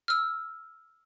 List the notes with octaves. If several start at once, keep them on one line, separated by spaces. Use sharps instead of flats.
E6 F6